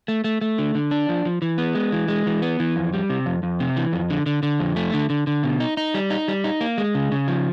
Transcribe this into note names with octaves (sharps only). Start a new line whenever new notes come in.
A3
A3
A3
D3
D3
D4
F3
F3
E3
B3
G#3
E3
G#3
E3
B3
E3
F2
G3
C3
F2
F2
C3
E3
F2
D3
D3
D3
F2
A3
D3
D3
D3
B2
D#4
D#4
G3
D#4
G3
D#4
A#3
G#3
C#3
C#3
F3